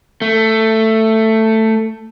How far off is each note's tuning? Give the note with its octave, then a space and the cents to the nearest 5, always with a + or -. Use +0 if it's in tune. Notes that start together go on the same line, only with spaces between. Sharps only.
A3 +10